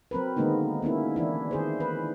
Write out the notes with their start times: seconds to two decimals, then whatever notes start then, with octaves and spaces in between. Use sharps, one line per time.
0.11 F#3 C4 A#4 B4
0.37 D3 D#3 G#3 A#3 B3 D#4
0.82 A#3 B3 C#4 E4
1.16 E3 D4 E4
1.51 D#3 G#4 C5
1.80 B4